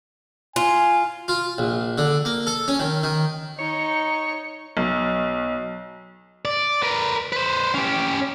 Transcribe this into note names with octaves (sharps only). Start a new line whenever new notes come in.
F4 G#5
F4
A#1
D3
A#3
A4
C#4
D#3
D#3
D#4 C#5
B1
D5
A#4 B4
B4 C5
C#4 G4